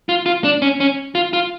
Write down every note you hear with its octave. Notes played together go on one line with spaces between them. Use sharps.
F4
F4
D4
C#4
C#4
F4
F4